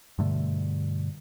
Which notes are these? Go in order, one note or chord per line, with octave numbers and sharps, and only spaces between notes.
G2 B2 D3 A3